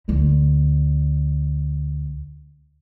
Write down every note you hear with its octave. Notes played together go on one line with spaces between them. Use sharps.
D2 D3